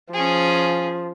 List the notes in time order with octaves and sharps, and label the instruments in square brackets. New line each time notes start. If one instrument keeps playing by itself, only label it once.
[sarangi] F3 [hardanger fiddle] C#4 G#4